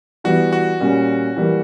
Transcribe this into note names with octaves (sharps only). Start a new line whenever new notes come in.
E3 G3 B3 F#4
F#4
A#2 G3 C#4
E3 G3 A#3